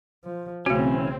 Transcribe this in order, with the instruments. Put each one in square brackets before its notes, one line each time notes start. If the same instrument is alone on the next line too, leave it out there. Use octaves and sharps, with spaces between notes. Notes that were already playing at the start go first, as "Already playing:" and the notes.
[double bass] F3
[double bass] B1 C#3 [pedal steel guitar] E3 C#4 [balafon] A3 F#4 [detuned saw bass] C4